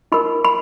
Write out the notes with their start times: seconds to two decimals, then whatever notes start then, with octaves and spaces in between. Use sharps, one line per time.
0.12 D#4 A#4 B5
0.45 B5